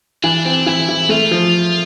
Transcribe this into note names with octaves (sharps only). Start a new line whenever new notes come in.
E3 D4
C4 D4
E3 E4
E3
A3 F4
F3